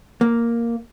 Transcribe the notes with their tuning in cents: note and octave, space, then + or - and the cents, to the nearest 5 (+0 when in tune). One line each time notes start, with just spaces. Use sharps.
A#3 +0